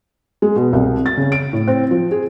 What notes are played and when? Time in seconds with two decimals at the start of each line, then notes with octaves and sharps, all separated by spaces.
0.42 G#3
0.56 B2
0.73 C2
1.06 A6
1.17 C#3
1.32 D7
1.53 A2
1.67 C4
1.91 F3
2.11 G#4